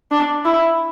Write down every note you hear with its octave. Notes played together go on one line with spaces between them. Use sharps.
D4
E4